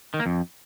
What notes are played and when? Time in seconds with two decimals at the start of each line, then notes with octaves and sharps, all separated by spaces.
0.14 D#3
0.20 A#3
0.26 F2